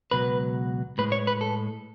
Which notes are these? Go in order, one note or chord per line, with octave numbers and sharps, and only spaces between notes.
C#2 B2 F#3 B4
A2 G#3 B4
C#5
B4
A4